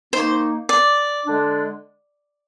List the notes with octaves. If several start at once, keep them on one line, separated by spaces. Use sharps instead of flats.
D#3 A#3 D#4 C5
D5
D3 G#3 D4